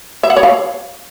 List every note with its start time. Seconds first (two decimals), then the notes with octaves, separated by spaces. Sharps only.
0.23 E5
0.30 F#5
0.36 C#5
0.43 F5